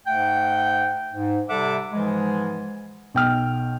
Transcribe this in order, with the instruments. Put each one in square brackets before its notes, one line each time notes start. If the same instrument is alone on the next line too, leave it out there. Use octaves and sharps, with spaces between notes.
[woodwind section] G#2 A3 F#5 G5
G#2
C3 G3 A4 E5 F#5 D6
G#2 E3 F3 G#3
[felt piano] B1 G5 F6